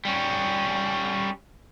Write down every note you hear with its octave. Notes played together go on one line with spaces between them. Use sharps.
G3 C#4